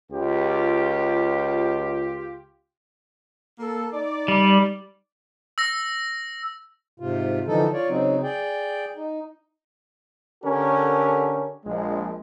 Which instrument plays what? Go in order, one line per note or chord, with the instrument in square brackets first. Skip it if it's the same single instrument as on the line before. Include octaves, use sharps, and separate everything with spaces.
[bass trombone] C#2 [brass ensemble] F4 G4
[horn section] A#3 A4
D#4 D5
[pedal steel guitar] G3
[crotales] E6 A#6
[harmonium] G#2 C3 F4
D3 E3 F3 D#4 A4
F4 C#5 D5
C#3 F#3 C4 D#4
G#4 D5 G5
D#4
[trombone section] D3 C#4 G4 A4 A#4
A#1 G#3